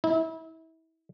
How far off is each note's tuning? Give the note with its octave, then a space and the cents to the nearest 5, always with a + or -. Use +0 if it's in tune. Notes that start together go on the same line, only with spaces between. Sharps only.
E4 -30